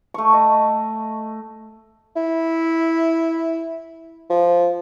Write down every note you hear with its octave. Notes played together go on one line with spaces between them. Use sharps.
A3 C#6
D#5
E4
F3